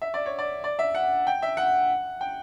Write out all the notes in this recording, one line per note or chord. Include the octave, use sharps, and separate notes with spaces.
E5
D5
C#5
D5
D5
E5
F#5
G5
E5
F#5
G5